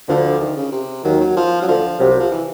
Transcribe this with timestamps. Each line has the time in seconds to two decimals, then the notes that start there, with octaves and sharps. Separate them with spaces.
0.09 D2 D3 F3
0.40 D#3
0.56 C#3
0.72 C3
1.04 D#2 D#3 F#3
1.20 F#3
1.36 F3
1.62 F#3
1.68 D2 D3 F3
2.00 C2 C3 F#3
2.10 F#3
2.20 F3
2.31 E3